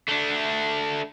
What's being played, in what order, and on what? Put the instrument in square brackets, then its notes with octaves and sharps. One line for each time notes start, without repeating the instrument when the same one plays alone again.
[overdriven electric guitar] A3 D4